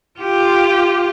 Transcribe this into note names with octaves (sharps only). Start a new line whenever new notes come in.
F4 G4